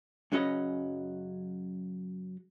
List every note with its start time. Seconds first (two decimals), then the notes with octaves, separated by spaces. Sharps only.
0.32 F#2 C#3 F#3 C#4 B4 D#5